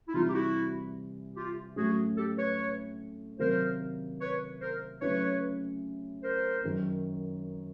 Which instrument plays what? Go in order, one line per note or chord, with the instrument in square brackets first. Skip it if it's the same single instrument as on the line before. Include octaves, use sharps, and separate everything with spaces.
[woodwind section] E4
[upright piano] C3 E3 G3 [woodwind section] D#4 F4
[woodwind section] G4
E4 F#4
F4 G4
[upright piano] A2 F#3 A3 C#4 [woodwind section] F#4 G#4
[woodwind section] G4 A4
B4 C#5
[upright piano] C3 D#3 F#3 A#3 [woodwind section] A#4 C5
[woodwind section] B4 C#5
A#4 C5
[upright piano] C#3 F#3 A3 C#4 E4 [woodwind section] B4 C#5
[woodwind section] A#4 C5
[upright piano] F#2 D#3 F#3